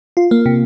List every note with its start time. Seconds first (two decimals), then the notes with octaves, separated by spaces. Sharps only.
0.17 F4
0.31 A#3
0.46 C3